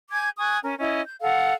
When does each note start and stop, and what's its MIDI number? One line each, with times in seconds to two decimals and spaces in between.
0.12 0.30 80
0.12 0.30 86
0.12 0.30 91
0.12 0.30 92
0.38 0.58 80
0.38 0.58 85
0.38 0.58 87
0.38 0.58 90
0.63 0.75 61
0.63 0.75 70
0.78 1.01 61
0.78 1.01 64
0.78 1.01 75
1.05 1.15 91
1.21 1.53 69
1.21 1.53 77
1.21 1.53 78